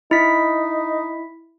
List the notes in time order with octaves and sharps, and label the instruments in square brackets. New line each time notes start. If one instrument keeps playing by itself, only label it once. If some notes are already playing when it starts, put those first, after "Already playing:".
[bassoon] D#4 [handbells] E4 B6